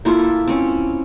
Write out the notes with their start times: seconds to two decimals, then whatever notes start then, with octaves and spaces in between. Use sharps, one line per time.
0.05 A#3 E4 F4 A4
0.48 C4 C#4